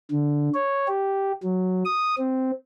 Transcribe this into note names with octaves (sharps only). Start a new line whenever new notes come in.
D3
C#5
G4
F#3
D#6
C4